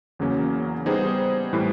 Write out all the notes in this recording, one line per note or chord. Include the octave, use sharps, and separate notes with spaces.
E2 C#3 F#3 A#3 C#4
G3 B3 D#4 G#4 C5
A2 E3 G3